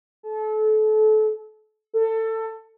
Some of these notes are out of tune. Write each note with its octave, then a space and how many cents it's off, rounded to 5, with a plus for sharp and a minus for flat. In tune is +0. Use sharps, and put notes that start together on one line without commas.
A4 -30
A4 +20